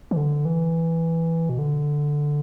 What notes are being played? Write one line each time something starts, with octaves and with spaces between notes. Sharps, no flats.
E3
D3
E3
B2
D3